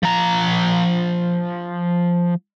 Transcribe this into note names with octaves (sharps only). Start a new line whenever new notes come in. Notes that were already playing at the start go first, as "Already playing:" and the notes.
F3 A#5